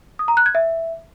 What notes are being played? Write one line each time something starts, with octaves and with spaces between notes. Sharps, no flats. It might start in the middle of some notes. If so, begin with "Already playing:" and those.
D#6
A#5
F#6
G#6
E5